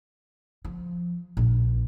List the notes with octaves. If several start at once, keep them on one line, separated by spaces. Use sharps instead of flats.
F3
A#1